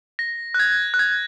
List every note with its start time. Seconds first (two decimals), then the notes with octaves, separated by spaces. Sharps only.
0.19 A#6
0.54 F#6
0.59 G#6
0.94 F#6
0.99 G#6